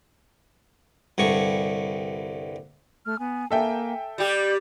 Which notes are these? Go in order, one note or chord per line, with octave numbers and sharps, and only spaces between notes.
C2 G2 D3 C#6
A3 F6
B3 G#5
A#3 A4 E5 G5 G#5
G3 G4 D5 G6